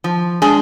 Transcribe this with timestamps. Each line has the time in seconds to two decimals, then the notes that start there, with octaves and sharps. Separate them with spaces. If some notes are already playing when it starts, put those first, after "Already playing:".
0.04 F3
0.42 G#3 D4 G#4